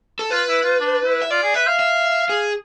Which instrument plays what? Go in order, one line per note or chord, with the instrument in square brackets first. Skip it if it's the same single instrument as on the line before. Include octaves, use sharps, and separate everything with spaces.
[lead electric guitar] A4
[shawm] F4 [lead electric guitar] B4
[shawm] E4
F4
D4
E4
[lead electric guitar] E5
[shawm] F4 [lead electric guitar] D5
[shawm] G#4
[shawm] B4 [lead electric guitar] E5
[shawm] F5
[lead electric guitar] E5
G#4